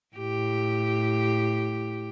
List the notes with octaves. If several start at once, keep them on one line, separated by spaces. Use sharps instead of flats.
A2 G4